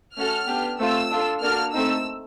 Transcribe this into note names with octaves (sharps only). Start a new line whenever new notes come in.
A3 C#4 F#4 A4 F6
B3 D4 G4
A3 C4 F4 E6
D4 F4 A4
A#3 D4 F#4 A4 F6
A3 C4 D#4 E6